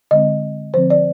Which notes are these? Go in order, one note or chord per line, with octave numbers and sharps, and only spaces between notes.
D3 G#3 C4 D#5
D3 F3 C4 C5
D5